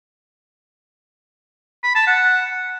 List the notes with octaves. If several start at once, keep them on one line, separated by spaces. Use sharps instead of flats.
B5
A5
F#5